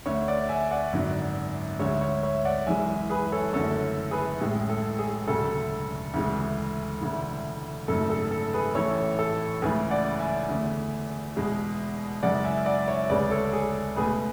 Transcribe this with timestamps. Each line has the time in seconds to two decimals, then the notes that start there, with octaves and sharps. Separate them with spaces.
0.06 D2 D3 A3 C#5 E5
0.28 D5 F#5
0.49 E5 G#5
0.71 D5 F#5
0.93 G#1 F#2 D3 F#3
1.80 D2 D3 G#3 C#5 E5
2.01 C#5 E5
2.23 C#5 E5
2.45 D5 F#5
2.67 F#1 F#2 E3 G#3 E5 G#5
3.10 G#4 B4
3.32 A4 C#5
3.53 F#1 F#2 D3 F#3 A3 A4 C#5
4.11 G#4 B4
4.40 A1 A2 G#3
4.69 A4
4.99 G#4
5.27 E1 D2 C#3 F#3 A4
6.14 D2 C#3 E3 G#3
7.01 E1 D2 C#3 E3
7.88 G#1 F#2 C#3 F#3 A3 A4
8.10 A4
8.31 A4
8.53 G#4 B4
8.75 A1 A2 E3 A4 C#5
9.19 A4
9.62 C#2 C#3 E3 A3 G#4 B4
9.90 D5 F#5
10.19 E5 G#5
10.49 E2 D3 A3
11.36 E2 B2 G#3
12.22 F#1 F#2 C#3 G#3 D5 F#5
12.44 E5 G#5
12.66 D5 F#5
12.88 C#5 E5
13.09 D2 C#3 G#3 B4 D5
13.31 A4 C#5
13.53 G#4
13.96 C#2 B2 A3 G#4 B4